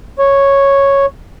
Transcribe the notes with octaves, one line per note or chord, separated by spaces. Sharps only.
C#5